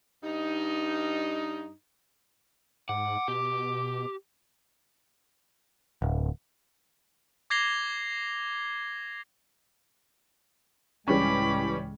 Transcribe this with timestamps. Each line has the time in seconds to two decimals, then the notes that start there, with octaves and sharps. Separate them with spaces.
0.23 G2 D#4
2.89 G#2 F#5 D6
3.28 B2 G4
6.02 D1
7.50 D6 G#6 A#6 C7 F7 G7
11.08 C#2 A2 E3 G3 G#3 C#4 B5 D6